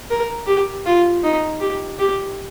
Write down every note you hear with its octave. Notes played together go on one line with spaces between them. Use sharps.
A#4
G4
F4
D#4
G4
G4